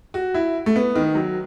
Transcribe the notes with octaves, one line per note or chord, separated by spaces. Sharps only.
F#4
E4
A3
B3
D#3
F#3